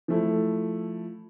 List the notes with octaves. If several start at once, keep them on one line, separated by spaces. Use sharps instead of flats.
F3 A3 E4